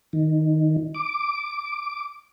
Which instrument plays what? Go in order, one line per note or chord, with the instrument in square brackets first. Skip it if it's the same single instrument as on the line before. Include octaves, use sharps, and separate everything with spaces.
[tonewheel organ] D#3
D6